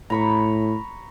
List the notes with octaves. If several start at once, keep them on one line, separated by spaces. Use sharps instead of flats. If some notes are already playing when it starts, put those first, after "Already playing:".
A2 A#5 B5 C#6